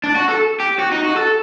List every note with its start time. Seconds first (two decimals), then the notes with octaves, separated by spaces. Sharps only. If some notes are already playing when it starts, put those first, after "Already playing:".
0.04 D4
0.15 F#4
0.29 A4
0.60 G4
0.79 F#4
0.91 D#4
1.04 F#4
1.16 A4